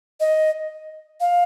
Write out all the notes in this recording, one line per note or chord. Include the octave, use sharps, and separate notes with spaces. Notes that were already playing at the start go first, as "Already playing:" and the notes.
D#5
F5